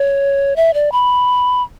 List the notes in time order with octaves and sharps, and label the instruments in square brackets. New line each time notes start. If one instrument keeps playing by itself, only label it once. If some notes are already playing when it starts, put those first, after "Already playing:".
Already playing: [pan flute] C#5
E5
D5
B5